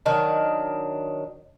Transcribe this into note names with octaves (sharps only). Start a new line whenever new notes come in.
D#3 F#3 D4